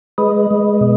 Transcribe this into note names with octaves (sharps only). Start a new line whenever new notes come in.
G#3 B4 D#5
G#3
B2